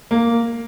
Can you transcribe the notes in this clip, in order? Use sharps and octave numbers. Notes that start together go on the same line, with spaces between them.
A#3